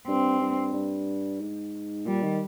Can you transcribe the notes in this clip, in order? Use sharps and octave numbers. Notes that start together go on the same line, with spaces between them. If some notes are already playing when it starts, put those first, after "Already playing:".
G2 C4
G2
G2
G#2
A#2 G3
D#3